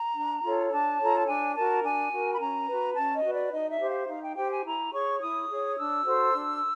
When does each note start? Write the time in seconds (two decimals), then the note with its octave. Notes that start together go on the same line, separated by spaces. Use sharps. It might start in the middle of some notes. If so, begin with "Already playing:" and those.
Already playing: A#5
0.15 D4
0.43 F4 A4 C#5
0.72 D4 A5
0.99 F4 A4 C#5 A#5
1.15 A5
1.27 D4 G#5
1.55 F#4 A#4 A5
1.84 D4 G#5
2.12 F#4 A#4
2.33 B5
2.40 C#4 A#5
2.68 F#4 B4
2.96 C#4 A5
3.15 D#5
3.24 F#4 B4
3.34 D5
3.52 D#4 D#5
3.71 E5
3.80 G4 C5
3.90 F5
4.09 D#4 F5
4.23 G5
4.37 G4 C5 G5
4.51 G#5
4.65 E4 A#5
4.93 G#4 C#5 C#6
5.21 E4 D#6
5.49 G#4 C#5
5.77 D4 E6
6.05 F#4 A4 C5
6.33 D4